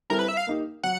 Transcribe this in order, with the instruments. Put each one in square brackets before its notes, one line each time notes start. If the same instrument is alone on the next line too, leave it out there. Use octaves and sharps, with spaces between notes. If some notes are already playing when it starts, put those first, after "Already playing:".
[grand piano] G3 C4 E4 A4 [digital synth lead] A#4
[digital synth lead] B4
E5
F5
[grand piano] A#3 D#4 G4
[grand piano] F#3 [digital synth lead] F#5